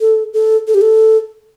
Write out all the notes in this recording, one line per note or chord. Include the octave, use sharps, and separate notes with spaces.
A4
A4
A4
G4
A4